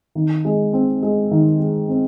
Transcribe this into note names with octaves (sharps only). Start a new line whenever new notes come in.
D#3
G#3
C4
G#3
D#3
G#3
C4